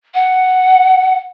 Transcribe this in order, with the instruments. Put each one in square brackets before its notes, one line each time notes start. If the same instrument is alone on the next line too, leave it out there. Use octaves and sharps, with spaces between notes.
[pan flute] F#5